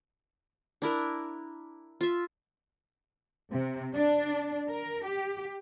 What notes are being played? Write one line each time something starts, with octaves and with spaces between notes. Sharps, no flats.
D4 E4 A#4
F4 E5
C3
D4
A#4
G4